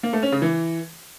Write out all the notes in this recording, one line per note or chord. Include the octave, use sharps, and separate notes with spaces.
A#3
A3
C#4
C#3
E3